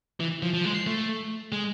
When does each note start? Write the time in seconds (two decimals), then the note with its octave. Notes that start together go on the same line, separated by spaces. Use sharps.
0.20 E3
0.43 F3
0.54 F3
0.65 G#3
0.87 A3
1.52 G#3